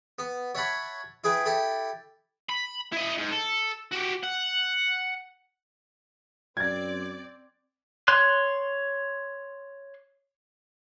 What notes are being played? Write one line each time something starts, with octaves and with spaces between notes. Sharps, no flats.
B3
C#5 E5 F#5 A5 B5 C#6
E4 G#4 B4 G5
E4 G4 A4 A5
B5
E4 D#5
G#2
A4
F#4 G4
F#5
F#2 C4 D5 G#6 A6
C#5 C6 F#6